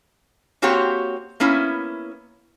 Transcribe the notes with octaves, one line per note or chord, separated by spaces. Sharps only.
A#3 C4 F#4 G4 C#5
A#3 B3 C#4 E4